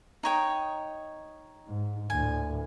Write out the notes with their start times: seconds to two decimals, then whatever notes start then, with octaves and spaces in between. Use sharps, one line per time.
0.23 D#4 C#5 G5
1.67 G#2
2.10 D2 A2 G#5